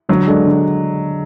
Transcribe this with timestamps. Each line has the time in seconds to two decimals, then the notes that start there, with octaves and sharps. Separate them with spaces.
0.09 D3 F#3
0.27 G#3 D4 A4
0.45 D3